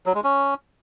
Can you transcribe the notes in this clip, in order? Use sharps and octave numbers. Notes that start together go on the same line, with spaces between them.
F#3
G#3
C#4